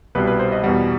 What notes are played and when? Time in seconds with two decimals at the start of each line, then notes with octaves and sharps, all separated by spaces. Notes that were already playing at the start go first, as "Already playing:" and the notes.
0.15 C2 B2 G3 B4
0.27 B4
0.39 C5
0.52 D#5
0.63 E2 B2 G3 F#5